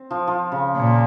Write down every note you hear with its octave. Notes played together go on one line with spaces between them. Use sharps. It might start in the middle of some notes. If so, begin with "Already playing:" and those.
Already playing: C4
F3
F3
C#3
A#2